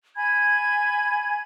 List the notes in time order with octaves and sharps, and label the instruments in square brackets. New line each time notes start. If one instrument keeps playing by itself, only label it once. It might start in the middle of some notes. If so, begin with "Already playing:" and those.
[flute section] G#5 B5 G#6